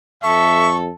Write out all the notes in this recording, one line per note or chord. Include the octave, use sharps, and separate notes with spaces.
F2 A4 E5 C#6